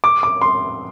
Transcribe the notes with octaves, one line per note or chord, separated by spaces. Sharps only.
D6
D6
C6